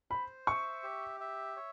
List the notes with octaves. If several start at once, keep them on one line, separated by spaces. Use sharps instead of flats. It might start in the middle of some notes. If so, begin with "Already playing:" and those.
C5 B5
E5 C#6
G4
E5
C#5